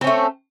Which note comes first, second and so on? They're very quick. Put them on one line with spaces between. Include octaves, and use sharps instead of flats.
C4 C#4 A3